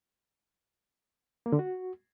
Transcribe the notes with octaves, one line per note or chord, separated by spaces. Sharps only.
A#3
D3
F#4